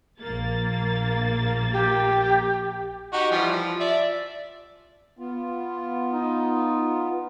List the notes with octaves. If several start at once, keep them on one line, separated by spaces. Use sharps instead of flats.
A#1 A#3 A6
G4
D#4 F#4 G4
E3 F3 G3
F3
D5 E5
B3 F4
D#4